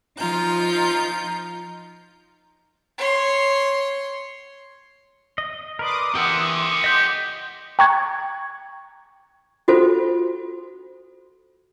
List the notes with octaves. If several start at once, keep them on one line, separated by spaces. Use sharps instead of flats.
F3 D#4 F4 A#5 G6
C#5 C6
D#5
A#4 B4 D5 C6 D6 D#6
E3 G4 A#4 F#5 E6
D#5 G6 B6
G5 A#5 C#6 F#6 G#6
F4 F#4 A4 C5